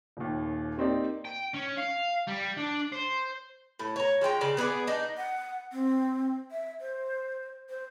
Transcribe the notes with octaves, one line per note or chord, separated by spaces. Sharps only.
D#1 D#2
A#3 C4 D#4 G4 D5
G5
C#4
F5
G3
D4
C5
A2
C#5 A#5
F3 G#3 G5 A#5
C#3 D5
B3 G#4 B4 D5
D4 D#4
F#5
C4
E5
C5
C5